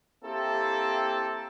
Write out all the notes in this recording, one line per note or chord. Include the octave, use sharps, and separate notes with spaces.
A#3 C4 E4 G4 A4